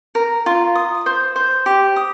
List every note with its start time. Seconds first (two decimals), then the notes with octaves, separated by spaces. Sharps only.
0.15 A#4
0.46 F4
0.75 D#6
1.06 C5
1.36 C5
1.66 G4
1.96 D#6